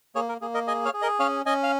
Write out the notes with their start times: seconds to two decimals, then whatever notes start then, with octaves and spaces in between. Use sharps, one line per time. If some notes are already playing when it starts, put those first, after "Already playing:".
0.15 A#3 G#4 C#5
0.29 A#4
0.41 A#3 G#4
0.54 A#4 D#5
0.67 G#4 D#5 G#5
0.85 C#5 F5
0.94 G#4
1.02 A#4 D#5
1.19 C#4 C#5 F5
1.46 C#4 D#5 G#5
1.63 F5